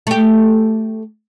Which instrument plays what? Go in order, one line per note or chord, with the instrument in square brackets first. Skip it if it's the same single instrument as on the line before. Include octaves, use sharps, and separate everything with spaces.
[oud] A3 G4